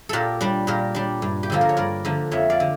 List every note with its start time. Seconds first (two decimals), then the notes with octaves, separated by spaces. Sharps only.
0.09 A#2 G4 A4 A#4
0.41 G3 D4
0.67 A#2 G4 A#4
0.95 G3 D4
1.22 G2
1.43 G4
1.50 D3 F3 A#3 A4
1.61 A#4
1.69 C#5
1.77 G2 A#4 D5
2.05 D3 F3 A#3
2.31 F2 C#5 E5
2.50 D5 F5
2.60 D3